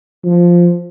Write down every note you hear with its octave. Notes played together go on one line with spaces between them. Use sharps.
F3